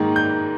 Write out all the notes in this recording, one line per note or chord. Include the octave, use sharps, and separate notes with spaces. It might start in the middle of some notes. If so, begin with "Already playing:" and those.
Already playing: G#2 D#3 A#3
G6